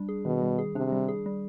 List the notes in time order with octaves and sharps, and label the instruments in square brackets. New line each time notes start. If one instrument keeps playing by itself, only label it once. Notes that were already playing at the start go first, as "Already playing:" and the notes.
Already playing: [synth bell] G3 D4
G#4
[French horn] B2 [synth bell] D#3
[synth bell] G3
G#4
[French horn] C3 [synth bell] D4
[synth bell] G3
G#4
G3